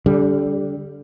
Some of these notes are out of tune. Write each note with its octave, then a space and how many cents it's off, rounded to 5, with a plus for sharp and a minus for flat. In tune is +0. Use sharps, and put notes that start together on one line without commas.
D3 -30 G3 +0